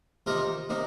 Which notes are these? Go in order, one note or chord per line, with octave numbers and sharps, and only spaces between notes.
C3 D#3 A#3 D#4 F4 A#4
C3 D#3 A#3 D#4